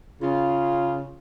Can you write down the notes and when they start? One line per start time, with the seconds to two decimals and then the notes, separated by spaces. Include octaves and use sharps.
0.22 C#3 F4